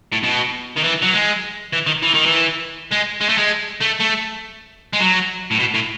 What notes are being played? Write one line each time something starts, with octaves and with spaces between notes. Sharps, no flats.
A2
B2
D#3
E3
F#3
G#3
E3
D#3
E3
D#3
E3
G#3
G#3
A3
G#3
A3
A3
G#3
F#3
A2
B2
A2